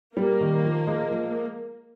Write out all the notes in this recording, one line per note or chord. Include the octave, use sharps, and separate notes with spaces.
G3 A#3
D#3
F3
G#3
F3